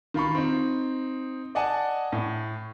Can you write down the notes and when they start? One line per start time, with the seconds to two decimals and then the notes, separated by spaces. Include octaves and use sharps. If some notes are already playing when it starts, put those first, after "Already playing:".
0.14 D#3 F4 B5 C#6
0.35 C4 D#4
1.55 D5 D#5 F#5 G#5 A5
2.12 A2